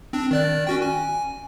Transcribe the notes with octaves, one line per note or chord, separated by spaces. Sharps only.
C4 D4
D#3 D5 F#6
C#4 F#4 G5
G#5